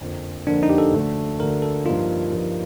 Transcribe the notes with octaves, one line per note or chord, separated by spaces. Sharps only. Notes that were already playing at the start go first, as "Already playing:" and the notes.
F2 D3 F3 A#3
F2 D3 F3 A#3 D4
D#4
G4
A4
D2 D3 A3 D4
D2 D3 A3 D4 A#4
A4
G2 F3 A#3 D#4 F4
G2 F3 A#3 D#4